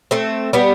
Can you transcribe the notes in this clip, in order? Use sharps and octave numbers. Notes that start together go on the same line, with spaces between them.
A3 C4
G3 B3